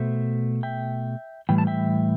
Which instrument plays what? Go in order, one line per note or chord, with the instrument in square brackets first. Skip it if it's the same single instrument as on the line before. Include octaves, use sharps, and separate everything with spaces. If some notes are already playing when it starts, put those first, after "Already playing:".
Already playing: [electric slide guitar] B2 A3 C5 E5
E5 G5
A2 E3 G3 G5
A5
E5 G5